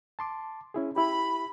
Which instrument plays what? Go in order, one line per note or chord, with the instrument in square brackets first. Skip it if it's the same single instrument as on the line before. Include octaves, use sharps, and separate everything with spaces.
[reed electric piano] A5 C6 D6
C#4 E4 G#4
[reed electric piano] E4 G4 [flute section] B5